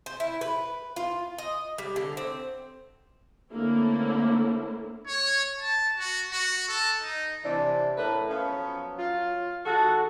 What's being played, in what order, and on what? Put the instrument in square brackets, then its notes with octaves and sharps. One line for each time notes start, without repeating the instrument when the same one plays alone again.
[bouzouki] C5
E4
B4
F4
D#5
G3
D3
C4
[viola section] D3 A3 A#3 C4 C#4 E4
[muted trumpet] C#5
A5
F#4
F#4
A4
D#4
[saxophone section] C3 E3 [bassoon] D4
[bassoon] A2 [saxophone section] A3 A#4 B4
[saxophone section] F3 B3 C#4
[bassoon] F#3
[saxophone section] F4
[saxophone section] D#3 G#3 F#4 [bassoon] A4